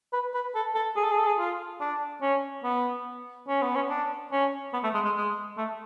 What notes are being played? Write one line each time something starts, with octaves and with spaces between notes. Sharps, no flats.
B4
B4
A4
A4
G#4
A4
G#4
A4
G#4
F4
D4
C#4
B3
C#4
B3
C#4
D4
C#4
B3
A3
G#3
G#3
G#3
A3